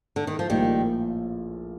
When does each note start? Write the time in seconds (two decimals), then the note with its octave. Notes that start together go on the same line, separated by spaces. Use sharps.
0.16 D3
0.27 D#3
0.39 F3
0.50 A#1 A2 D#3 F3 G3 A#3